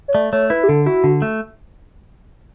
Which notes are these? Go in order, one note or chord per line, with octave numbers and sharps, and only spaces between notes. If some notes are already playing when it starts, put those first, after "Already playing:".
C#5
A3 D5
A3 C#5
E4 B4
G4
D3 A4
E4 F#4
D3
A3